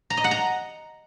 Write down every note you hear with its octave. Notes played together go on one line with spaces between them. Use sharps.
A#5
D#5
F#5
A#5